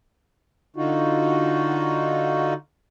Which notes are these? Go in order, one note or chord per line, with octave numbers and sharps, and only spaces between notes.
D3 D#4 F4 F#4